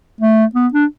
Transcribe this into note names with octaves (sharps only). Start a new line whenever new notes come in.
A3
B3
D4